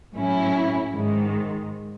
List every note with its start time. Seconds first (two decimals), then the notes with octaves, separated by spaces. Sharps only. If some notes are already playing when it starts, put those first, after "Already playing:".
0.14 A2 F#3 C#4 E4
0.92 G#2 D#3 G#3